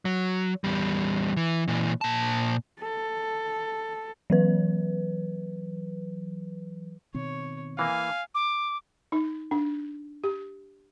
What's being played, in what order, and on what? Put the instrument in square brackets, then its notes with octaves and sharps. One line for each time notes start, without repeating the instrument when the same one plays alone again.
[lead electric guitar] F#3
E2 G3
E3
A#2 E3
A#2 A5
[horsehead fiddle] A4
[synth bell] E3 F#3 B4
[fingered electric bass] B2 D#3 C4 [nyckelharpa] C#5
[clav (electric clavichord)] E3 A#3 [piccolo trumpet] F5 [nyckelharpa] G#5
[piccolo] D6
[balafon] D#4
D4
G4